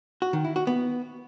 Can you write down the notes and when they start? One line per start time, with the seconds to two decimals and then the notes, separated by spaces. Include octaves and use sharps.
0.22 F#4
0.33 D#3
0.45 E4
0.56 F#4
0.67 B3